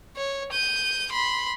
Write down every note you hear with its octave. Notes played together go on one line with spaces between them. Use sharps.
C#5
G6 D#7
B5 C6